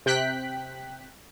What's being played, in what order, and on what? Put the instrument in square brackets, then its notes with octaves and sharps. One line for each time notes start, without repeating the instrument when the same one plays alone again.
[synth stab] C3 G5 F#6 B6